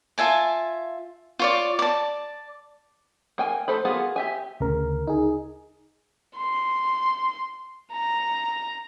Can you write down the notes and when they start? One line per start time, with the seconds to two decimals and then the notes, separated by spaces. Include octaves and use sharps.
0.18 F4 E5 G#5 A5
1.39 F4 C#5 D5
1.79 D5 A5
3.38 A#3 G5 G#5
3.68 A3 A4 C5 B5
3.85 A#3 B3 F4 F#4 G#4
4.16 G4 E5 G#5
4.60 D2 C#3 A#4
5.07 D#4 G#4
6.37 C6
7.92 A#5